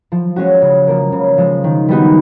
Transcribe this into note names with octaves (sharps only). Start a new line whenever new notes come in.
F3
G#3 C#4 F#4
C#3
F3 A#3
C#3
F3 G#3
D#3
G3 B3 D#4 F#4